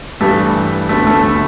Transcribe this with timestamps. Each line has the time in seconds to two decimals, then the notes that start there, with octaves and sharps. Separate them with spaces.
0.21 G2 E3 G3 A3
0.89 D2 D3 A3 B3
1.07 A3
1.24 A3